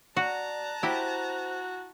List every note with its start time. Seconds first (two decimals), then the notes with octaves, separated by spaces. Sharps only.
0.17 F#4 D5 A5 A#5 F#6
0.83 E4 F#4 G4 C5